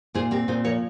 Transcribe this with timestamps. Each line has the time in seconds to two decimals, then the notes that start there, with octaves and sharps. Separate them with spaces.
0.15 A#2 G#4 C5
0.31 C4 G4 A#4
0.48 A#2 G#4 C5
0.64 F3 A#4 C#5